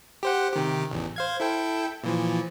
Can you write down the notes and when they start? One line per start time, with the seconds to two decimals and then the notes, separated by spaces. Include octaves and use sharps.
0.23 G4 C5 F#5
0.53 C3 D#3 G4
0.91 A1 E2
1.16 C5 F5 G#6
1.40 E4 A4 G5
2.04 A#2 E3 F3